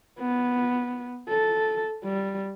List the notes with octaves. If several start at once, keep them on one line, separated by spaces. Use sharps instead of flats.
B3
A4
G3